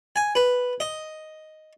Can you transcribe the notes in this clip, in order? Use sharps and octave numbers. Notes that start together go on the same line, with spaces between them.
G#5
B4
D#5